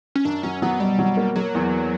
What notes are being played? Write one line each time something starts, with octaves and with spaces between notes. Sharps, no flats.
C#4
F#2 D4
F#3 C#4
F#3 B3
B2 G3
F#3
A#3
F#3 A#3
E2